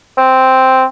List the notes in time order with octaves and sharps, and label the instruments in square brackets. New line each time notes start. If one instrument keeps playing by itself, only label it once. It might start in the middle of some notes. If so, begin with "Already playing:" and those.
[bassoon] C4